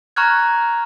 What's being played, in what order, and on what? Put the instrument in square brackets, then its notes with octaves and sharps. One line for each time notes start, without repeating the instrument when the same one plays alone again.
[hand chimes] A#5 C#6 F6 F#6 G#6